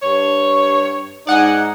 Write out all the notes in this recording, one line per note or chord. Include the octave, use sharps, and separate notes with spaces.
G2 C#5
G#2 D#4 D5 F#5 G#5